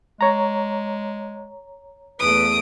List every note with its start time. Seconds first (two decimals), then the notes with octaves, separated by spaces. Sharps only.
0.21 G#3 C#5 A#5
2.20 E2 A3 B4 D#6 D7